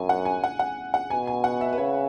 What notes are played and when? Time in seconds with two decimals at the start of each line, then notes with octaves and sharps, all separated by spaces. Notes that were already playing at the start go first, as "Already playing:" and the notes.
Already playing: F#2 G#5
0.09 F#5
0.25 G#5
0.44 F#5
0.59 F#5
0.94 F#5
1.10 B2 G#5
1.27 G#5
1.44 F#5
1.61 E5
1.73 B4
1.78 C#3 C#5